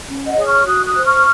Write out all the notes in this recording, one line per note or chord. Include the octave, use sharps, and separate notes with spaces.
C#4
D#5 F#5
G#4 C#5 D#6
C#6 F6
F#4 D#6 F#6
D#6 F#6
C5
C#6 F6